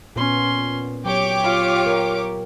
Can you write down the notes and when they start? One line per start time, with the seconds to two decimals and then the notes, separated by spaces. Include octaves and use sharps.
0.16 A#2 B3 C#4 C6
1.05 F#3 G4 C#5 G5 D6
1.44 F4
1.86 A#4